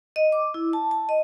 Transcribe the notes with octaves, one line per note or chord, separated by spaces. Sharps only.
D#5
D6
E4
A5
A5
D#5